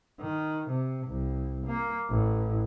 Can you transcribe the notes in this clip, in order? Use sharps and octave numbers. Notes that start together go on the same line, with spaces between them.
D#3
C3
C2
A#3
A1